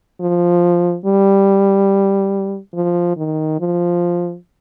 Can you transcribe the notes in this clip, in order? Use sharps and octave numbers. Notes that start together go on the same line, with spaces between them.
F3
G3
F3
D#3
F3